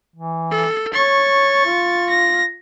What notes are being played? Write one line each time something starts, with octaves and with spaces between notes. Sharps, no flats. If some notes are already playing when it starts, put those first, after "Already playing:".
E3
A4
C#5 C#6 A6
F4
A#6